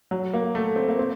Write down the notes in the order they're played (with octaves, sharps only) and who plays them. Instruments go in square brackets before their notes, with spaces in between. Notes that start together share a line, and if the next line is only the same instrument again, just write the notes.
[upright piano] F#3
A#3
A3
C4
A#3
C4